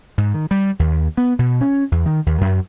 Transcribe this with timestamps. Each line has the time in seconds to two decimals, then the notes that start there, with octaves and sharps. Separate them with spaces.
0.18 G#2
0.34 D#3
0.51 G3
0.79 D#2
1.17 B3
1.39 B2
1.61 C#4
1.92 E2
2.06 D#3
2.26 D#2
2.41 F#2